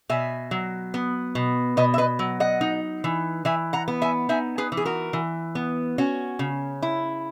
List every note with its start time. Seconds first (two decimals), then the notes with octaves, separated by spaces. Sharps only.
0.09 B2 E5 G#5
0.51 F#3
0.94 B3
1.35 B2
1.77 B2 B4 D#5
1.94 E5
1.98 B4 D#5
2.19 F#3
2.40 D#5 F#5
2.61 D#4
3.04 E3
3.45 E3 E5 G#5
3.73 F#5 A#5
3.88 B3
4.02 E5 G#5
4.29 D#4 E5 G#5
4.58 G#4 B4
4.72 E3
4.77 G#4
4.85 F#4 A#4
5.13 E3
5.55 B3
5.98 C#4 F#4
6.39 C#3
6.82 E4